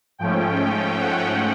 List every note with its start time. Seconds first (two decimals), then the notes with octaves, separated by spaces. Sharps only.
0.19 G#2 F3 A3 C#4 G5
1.00 F#5